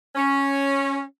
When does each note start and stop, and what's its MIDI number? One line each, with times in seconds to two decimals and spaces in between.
0.15 1.00 61